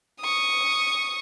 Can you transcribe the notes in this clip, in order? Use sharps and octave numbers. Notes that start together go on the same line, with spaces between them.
C#6 D#6